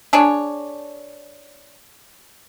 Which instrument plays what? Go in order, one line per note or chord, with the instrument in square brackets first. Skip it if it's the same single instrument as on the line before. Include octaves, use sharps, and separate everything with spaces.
[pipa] D4 G#4 C#5